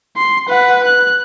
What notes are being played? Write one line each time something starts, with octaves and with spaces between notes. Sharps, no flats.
C6
B4 F#5
F#6